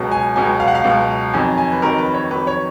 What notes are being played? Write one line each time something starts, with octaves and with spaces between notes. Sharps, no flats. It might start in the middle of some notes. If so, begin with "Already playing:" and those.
Already playing: C#2 B2 F#3
G#5
C#2 B2 F#3 G#5
F5
F#5
F5
C#2 B2 F#3
F2 D#3 F#3 G#5
G#5
B4
F2 D#3 F#3 A#4
B4
C#5
F2 D#3 F#3 B4
C#5